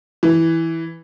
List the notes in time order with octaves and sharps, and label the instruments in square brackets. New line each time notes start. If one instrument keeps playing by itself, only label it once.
[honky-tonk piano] E3